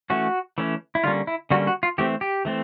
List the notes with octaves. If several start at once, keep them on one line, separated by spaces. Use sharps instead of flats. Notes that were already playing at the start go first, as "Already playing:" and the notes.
E3 A3 C#4 F#4
E3 A3 C#4
E4
D3 G3 A#3 C#4 F4
E4
D3 G3 A#3 C#4 F#4
F#4
F4
E3 A3 C4 G4
G4
E3 A3 C4